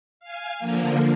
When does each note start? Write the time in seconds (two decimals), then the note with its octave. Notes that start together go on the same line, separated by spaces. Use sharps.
0.20 F5 G#5
0.59 D3 F3 A#3